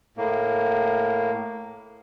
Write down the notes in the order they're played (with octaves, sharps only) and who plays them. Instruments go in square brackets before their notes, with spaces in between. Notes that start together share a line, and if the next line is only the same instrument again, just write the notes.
[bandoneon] A2 A#3